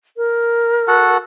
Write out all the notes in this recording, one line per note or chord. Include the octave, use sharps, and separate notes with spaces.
A#4
F#4 A4 F#5